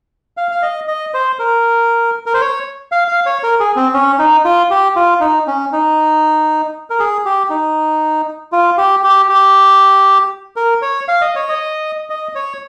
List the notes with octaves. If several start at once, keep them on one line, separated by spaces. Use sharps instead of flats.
F5
F5
D#5
D#5
C5
A#4
A#4
C5
C#5
F5
F5
C#5
A#4
G#4
C4
C#4
D#4
F4
G4
F4
D#4
C#4
D#4
A#4
G#4
G4
D#4
F4
G4
G4
G4
A#4
C#5
F5
D#5
C#5
D#5
D#5
C#5